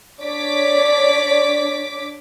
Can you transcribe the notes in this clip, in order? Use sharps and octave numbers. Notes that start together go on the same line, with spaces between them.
D4 C#5 D5 D6 B6